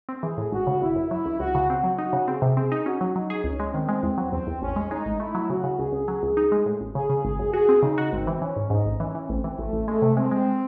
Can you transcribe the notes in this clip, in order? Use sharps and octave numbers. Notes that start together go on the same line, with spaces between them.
C4
E3 G#4
A2
G#1 F#4
C#3
G#1 E4
F#2
F#3 E4
C#2
C#2 F#4
C#3
C4 F#4
F#3
D#4 F#4
C#3
C4 G#4
C3
C4 G#4
D#4
C#4 F#4
F#3
F#3 D#4
G#4
C#2 C#4
G#3
D#3 C4
G#3
E2
F#3
E2 C4
E2
A1 C#4
G#3
G#3 D#4
A1
A3 E4
F#3
C#3 F#4
C#3
C#2 G#4
C#2
F#3 G#4
C#2
D#4
G#3
A2
A1
C#3 G#4
C#3
G#1 G#4
F#2
F#4 G#4
C4
C#3 D#4
F#4
G#1 C4
E3
E3 C#4
G#2
G#2 D#4
A1
E3 C#4
E3
A1 C4
E3
A1 A3
A1
G#3 A3
C3
G#3 C4
G#3